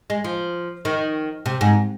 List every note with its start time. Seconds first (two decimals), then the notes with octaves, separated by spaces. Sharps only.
0.10 G#3
0.24 F3
0.85 D#3
1.46 C3
1.61 G#2